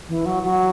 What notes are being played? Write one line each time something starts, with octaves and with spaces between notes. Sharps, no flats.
E3
F#3
F#3